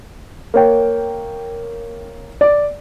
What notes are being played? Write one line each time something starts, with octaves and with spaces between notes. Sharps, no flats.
A#3 C#5 G5
D5